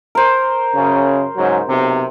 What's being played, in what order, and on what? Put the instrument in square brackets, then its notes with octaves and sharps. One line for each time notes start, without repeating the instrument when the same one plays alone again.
[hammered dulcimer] A#4 C5
[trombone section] F#2 C#3
G#2 C#3 F#3
B1 C3